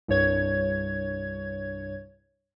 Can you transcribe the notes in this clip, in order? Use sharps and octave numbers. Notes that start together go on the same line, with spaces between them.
C2 G2 C#5 G#6